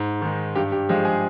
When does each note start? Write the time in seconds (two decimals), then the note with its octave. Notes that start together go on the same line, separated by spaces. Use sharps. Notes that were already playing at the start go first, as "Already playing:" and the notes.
Already playing: G#2
0.22 D#3 G#3
0.55 G2 G4
0.72 G4
0.89 F3 G#3 G4
1.05 G#4